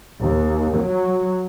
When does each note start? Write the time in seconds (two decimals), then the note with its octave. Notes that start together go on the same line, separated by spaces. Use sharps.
0.21 D#2
0.78 F#3